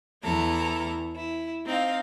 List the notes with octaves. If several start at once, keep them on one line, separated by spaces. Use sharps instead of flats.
E2 E4 A4 A#5
E4
C4 D#4 F5